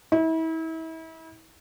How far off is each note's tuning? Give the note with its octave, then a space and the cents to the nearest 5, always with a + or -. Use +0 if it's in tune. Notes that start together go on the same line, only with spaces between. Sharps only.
E4 -35